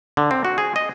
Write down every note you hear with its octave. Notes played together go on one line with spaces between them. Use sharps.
D3
C4
F#4
G#4
D#5